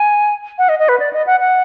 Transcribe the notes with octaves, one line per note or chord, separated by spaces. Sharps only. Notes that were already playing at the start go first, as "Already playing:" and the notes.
Already playing: G#5
F#5
D#5
D#5
B4
D5
D#5
F#5
F#5